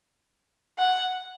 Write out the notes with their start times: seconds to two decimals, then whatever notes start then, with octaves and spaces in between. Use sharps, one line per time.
0.78 F#5